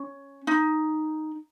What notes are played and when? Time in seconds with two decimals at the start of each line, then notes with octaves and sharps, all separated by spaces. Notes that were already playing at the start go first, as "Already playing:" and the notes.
Already playing: C#4
0.47 D#4